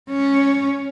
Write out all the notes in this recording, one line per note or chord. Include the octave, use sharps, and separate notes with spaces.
C#4